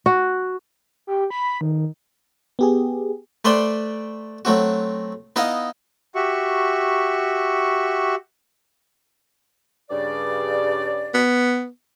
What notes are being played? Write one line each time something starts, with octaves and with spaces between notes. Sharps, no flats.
F#4
G4
B5
D#3
B3 G4 G#4
A3 B4 C5 D5 G5 C6
F#3 A3 C4 F#4
B3 D#4 E4 D#5 F5
F#4 G4 E5 C#6
G2 C#3 D5
B3